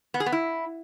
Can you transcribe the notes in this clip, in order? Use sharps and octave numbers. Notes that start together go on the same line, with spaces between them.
B3
G#4
B3
E4